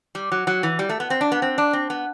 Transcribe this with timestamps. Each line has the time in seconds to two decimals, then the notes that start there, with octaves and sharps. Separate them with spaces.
0.15 G3
0.32 F#3
0.47 F#3
0.63 E3
0.79 G3
0.89 A3
1.00 B3
1.10 C4
1.21 D4
1.32 B3
1.42 C4
1.58 D4
1.73 C4
1.90 B3